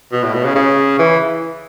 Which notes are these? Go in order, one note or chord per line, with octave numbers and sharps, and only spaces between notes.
B2
A2
B2
C#3
C#3
E3